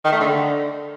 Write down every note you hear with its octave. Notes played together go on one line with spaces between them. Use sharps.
D#3
A3
D3